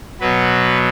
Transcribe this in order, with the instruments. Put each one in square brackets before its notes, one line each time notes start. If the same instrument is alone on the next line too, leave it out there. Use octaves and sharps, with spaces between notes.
[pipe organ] B2 F#3 B4